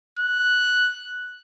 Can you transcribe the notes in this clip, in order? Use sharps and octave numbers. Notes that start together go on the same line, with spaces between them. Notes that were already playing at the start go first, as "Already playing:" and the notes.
F#6